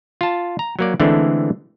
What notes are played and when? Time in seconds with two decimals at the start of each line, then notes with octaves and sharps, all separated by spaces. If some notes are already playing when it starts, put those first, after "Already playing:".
0.21 F4 A5
0.59 A#5
0.79 F#3 A#3 D5
1.00 D3 E3 G#3 A3 C4 D4